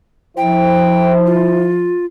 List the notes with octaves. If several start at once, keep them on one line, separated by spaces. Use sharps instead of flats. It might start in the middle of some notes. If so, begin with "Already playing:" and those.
F3 E4 C5 G5
F4